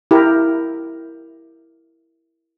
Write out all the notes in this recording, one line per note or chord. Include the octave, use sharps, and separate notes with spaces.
E4 G4 A#4